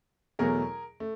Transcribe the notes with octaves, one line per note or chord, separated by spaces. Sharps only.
E2 B2 F#3 A3 G#4 A#4
A3